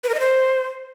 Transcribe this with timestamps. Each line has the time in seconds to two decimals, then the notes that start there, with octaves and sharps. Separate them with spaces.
0.04 B4
0.09 A#4
0.14 D#5
0.20 C5